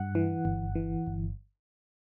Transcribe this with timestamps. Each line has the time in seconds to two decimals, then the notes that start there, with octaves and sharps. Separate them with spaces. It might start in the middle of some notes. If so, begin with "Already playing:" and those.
Already playing: G2 F#5
0.15 E3
0.45 G1
0.75 E3
1.07 G1